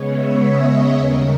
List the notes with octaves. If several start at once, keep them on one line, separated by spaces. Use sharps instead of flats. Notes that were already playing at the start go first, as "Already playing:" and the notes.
Already playing: C#3 G#3 B3 C#5
E5
D#5
D#2 C#3 G3 A#4